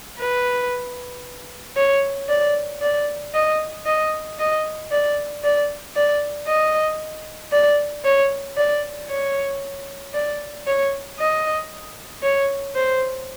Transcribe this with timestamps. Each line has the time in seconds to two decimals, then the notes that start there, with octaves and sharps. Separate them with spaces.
0.20 B4
1.76 C#5
2.29 D5
2.82 D5
3.34 D#5
3.86 D#5
4.39 D#5
4.91 D5
5.44 D5
5.96 D5
6.47 D#5
7.52 D5
8.04 C#5
8.57 D5
9.10 C#5
10.14 D5
10.67 C#5
11.19 D#5
12.23 C#5
12.75 C5